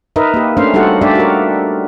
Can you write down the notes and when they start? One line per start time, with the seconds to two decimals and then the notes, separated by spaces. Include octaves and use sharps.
0.16 D#4 A#4 B4 D#5 E5
0.34 A#3 G4
0.57 A3 C#4 D4 C5 F5
0.74 G3 D#4 F#4 G4 A4 F#5
1.01 A3 D4 G4 D5 E5
1.15 F#4 A#4